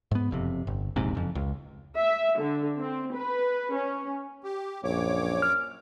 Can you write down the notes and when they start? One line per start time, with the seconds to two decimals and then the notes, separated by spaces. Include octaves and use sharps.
0.11 G#2 B3
0.31 F#1 F2 C3
0.67 G1
0.96 E1 A#1 G#2 C3
1.15 F#1 F2
1.35 C#2
1.95 E5
2.39 D3
2.79 C4
3.14 B4
3.73 C#4
4.44 G4
4.84 A#1 F#2 C#5 D6
5.42 F6